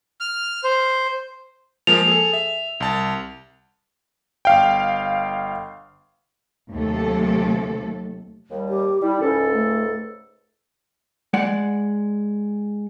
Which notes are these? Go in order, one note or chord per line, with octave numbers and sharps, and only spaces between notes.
F6
C5
F3 G#3 A#3 F7
G#4 A4
E5
C2 A5 A6
G1 F5 G5
D#2 C3 F#3 A3 A4
D#2 G3
G4
G3 E4
C#2 G#2 C#4 A4
A3
G#3 D5 F#5